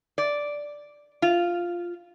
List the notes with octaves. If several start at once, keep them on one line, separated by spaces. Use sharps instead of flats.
D5
F4